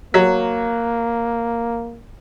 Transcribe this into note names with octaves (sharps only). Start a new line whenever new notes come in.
F#3 A#3